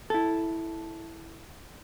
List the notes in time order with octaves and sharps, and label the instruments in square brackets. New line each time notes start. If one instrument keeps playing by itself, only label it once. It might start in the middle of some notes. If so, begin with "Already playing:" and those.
[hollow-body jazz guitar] E4 A4